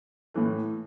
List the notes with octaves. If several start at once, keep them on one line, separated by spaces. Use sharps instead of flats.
A2 E3 A3